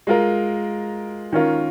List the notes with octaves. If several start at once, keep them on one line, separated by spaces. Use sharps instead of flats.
G#3 F4 A#4
D#3 C#4 F4 A#4